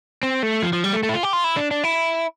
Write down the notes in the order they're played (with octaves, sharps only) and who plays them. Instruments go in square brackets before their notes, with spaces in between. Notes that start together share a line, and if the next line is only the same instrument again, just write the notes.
[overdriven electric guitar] C4
A3
F3
F3
G3
A3
A3
E4
F4
G4
F4
E4
D4
D4
E4